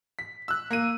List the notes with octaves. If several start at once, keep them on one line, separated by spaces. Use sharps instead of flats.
B6
E6 F#6
A#3 D#7